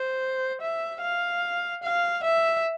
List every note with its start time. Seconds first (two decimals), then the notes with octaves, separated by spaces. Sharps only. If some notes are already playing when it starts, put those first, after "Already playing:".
Already playing: C5
0.61 E5
1.02 F5
1.83 F5
2.24 E5